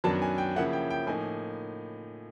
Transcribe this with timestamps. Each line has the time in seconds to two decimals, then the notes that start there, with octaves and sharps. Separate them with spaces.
0.04 F#2 D#3 F#3 B3 D4 A5
0.22 G#5
0.38 G5
0.56 C#3 F3 A#3 C#4 E4 F#5
0.73 G5
0.91 G5
1.07 A2 F3 A#3 D#4 G#5